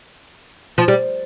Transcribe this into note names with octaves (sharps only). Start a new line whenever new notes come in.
F3
G3